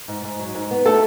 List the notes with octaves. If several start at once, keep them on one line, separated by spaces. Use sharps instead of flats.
G#2
G#2
F#3
G#2
B3
A3 A4